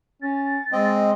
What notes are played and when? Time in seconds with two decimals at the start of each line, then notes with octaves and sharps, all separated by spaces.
0.22 C#4 A6
0.72 G#3 C4 D#5